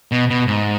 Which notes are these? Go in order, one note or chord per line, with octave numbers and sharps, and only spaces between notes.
B2
B2
G#2